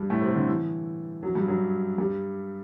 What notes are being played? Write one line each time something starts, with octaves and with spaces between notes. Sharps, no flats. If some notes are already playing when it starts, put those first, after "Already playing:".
Already playing: G2 G3
A2 A3
C3 C4
D3
E3
F#2 F#3
G2 G3
F#2 F#3
G2 G3